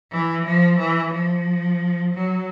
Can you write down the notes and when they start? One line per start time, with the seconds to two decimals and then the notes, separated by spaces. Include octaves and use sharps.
0.12 E3
0.46 F3
0.79 E3
1.13 F3
2.13 F#3